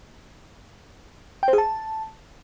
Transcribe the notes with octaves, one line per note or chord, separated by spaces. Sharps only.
G5
C5
G#4
A5